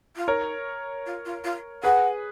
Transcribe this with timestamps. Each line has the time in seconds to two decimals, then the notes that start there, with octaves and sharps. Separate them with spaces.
0.16 F4
0.28 D#4 A#4 C#5
1.06 F4
1.25 F4
1.44 F4
1.83 G#4 B4 F#5